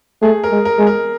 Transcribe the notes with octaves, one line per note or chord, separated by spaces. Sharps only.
A3 G#4
A#4
G#3
A#4
G#3
A#4